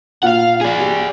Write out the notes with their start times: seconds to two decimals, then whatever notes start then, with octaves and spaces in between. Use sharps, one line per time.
0.23 A#2 F4 F5 F#5
0.61 G#4 D5
0.80 G4